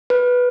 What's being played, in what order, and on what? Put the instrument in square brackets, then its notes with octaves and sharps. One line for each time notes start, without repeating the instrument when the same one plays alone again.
[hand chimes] B4